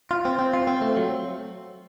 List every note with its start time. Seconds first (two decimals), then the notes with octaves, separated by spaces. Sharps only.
0.11 F4
0.25 C4
0.39 C4
0.54 F4
0.67 C4
0.82 A3
0.97 F#3